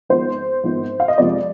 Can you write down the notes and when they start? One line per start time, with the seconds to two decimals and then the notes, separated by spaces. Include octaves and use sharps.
0.09 G#1 G#2 F3 G#3 B3 C5
0.64 G#1 G#2 F3 G#3 B3
1.00 F5
1.08 D#5
1.18 F2 C3 F3 G#3 D5